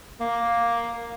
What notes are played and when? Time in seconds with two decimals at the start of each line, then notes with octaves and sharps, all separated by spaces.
0.20 A#3